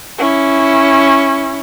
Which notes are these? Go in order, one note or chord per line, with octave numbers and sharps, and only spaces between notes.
C#4 E4